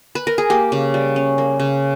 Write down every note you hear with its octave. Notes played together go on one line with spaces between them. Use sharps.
B4
A#4
G#4
A#3 G4
C#3
G3
C#4
A#3
C#3